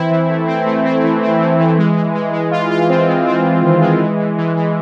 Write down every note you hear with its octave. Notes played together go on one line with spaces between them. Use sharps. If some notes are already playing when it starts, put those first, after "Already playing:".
Already playing: E3 C4 E4
E3
A3
C4
A3
C4
E3
C4
E3
E3
G#3
G#3
G#3
G#3
F4
F4
C4
G#3
C4
G#3
D#3
G#3
E3
E3
E3
E3